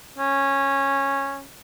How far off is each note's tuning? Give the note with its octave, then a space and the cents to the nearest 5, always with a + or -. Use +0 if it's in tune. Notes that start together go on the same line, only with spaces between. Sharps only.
C#4 -10